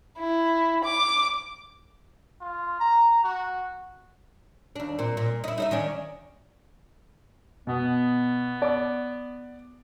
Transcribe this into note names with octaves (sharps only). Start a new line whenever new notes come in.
E4
D6
F4
A#5
F#4
D#2 D4
A#2 C4
A#2
D#4 E4
D#4 D#5 E5
D#3 C#4 D4
B2 B3
D5 D6